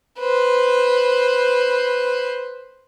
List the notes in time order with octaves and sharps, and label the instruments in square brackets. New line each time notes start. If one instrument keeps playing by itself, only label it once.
[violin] B4 C5